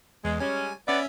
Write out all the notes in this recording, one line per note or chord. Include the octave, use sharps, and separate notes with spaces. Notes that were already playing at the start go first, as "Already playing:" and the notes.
E2 G#3
G3 G#3 C#4 G#5
B3 C#4 D5 E5